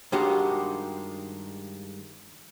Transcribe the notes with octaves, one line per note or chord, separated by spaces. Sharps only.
G2 D#3 G#3 F#4 G4